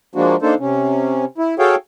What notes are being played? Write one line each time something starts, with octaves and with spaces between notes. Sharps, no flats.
F3 G#3 A#3 D4 F#4
A#3 D4 D#4 A4 C5
C3 C#4
E4
F#4 G#4 A4 C#5 F5 G5